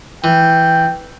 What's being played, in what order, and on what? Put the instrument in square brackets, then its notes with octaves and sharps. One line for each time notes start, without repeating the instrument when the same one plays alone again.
[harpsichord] E3 [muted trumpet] G5